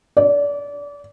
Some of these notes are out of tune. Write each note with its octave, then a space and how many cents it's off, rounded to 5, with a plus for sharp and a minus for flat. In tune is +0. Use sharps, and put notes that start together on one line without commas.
D5 -30